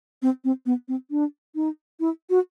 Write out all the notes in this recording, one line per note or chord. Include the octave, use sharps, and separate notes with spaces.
C4
C4
B3
C4
D4
D#4
E4
F#4